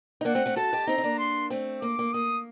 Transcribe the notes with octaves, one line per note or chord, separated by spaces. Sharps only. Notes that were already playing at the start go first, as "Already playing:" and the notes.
D#4
A#3 D4 F#5
A3 C4
A3 C4
F#4 A4 A5
D#4 G4
C4 D#4 A#5
D#4
A#3 D4
C6
A3 C4
A#3 D6
A#3
A#3 D#6